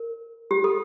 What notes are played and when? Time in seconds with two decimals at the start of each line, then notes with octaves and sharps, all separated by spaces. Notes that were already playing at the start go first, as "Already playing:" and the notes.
Already playing: A#4
0.51 G4
0.64 A4